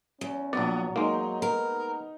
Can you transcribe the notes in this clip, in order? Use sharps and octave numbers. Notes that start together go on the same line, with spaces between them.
E2 C#4
A#1 F#3 B3 D5
G#3 A#3 D#4
B3 A#4